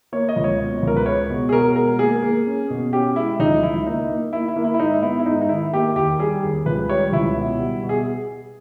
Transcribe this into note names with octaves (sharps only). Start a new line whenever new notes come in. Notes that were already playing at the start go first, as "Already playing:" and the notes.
A#3 C#5
D#5
C#2
C#5
B2
C#2 A#4
B4
G#3 C#5
B2
G#4
B2 A#4
G#3 A#4
A#3 G#4
A#3
C#4
B2
C#4 G4
G#3 E4
C#2 D#4
C#2 E4
A#3 D#4
A#3
A#3 E4
E4
A#3
E4
E4
G#2 D#4
B3 E4
E4
G#2 D#4
D#4
D#3 E4
A#3 G4
D#2 G4
G3 G#4
D#2
C#2 B4
G3 C#5
C#2 E4
B2
G3
B2
G#4